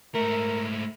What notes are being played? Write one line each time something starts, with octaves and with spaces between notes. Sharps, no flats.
G#2 A3 A#4